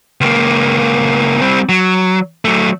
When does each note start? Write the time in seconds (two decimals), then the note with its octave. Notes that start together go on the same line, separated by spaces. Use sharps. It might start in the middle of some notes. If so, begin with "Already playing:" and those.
0.21 C#2 A#3
1.41 G3 C4
1.69 F#3
2.45 F#3 A3